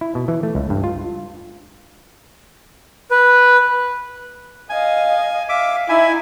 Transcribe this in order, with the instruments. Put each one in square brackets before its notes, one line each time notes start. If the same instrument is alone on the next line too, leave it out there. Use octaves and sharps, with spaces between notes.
[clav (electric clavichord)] E4
B2
E3
A3
C#2
G2
F4
[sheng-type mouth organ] B4
[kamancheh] D#5 F5 [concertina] G#5
[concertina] E5 D6 [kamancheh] F5
[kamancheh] D#4 [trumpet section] E4 [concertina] E5 G#5